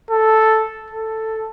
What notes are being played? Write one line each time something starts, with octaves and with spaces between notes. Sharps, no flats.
A4
A4